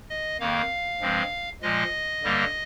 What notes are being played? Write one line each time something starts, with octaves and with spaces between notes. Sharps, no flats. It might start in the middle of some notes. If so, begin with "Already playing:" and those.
D#5
F2 D#3 A#3 F5
G2 F3 G#3 C4
A#2 F3 G#3 D#5
G2 D3 G3 A#3